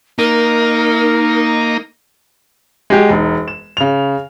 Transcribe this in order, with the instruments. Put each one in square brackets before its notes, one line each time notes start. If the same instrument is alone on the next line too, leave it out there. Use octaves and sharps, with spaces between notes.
[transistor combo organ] A#3 [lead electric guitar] D#4 [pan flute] A#4
[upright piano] G#3 F#4 G4
E1 D#4
E7
C#3 F7